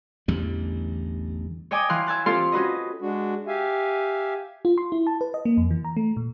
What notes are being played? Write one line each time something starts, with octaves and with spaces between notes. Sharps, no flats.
A1 E2 D3 G3
C#5 D#5 G5 G#5 D6 D#6
E3 F5 C6 F#6
E5 G#5 A5 F#6
C4 F4 G4 A4 F5 C6
C#4 F#4 B4 D#5
G#3 D4 F#4
G4 E5 F5 G#5
F4
C6
E4
A5
B4
D#5
A#3
F2
E3
A#5
A3
A#2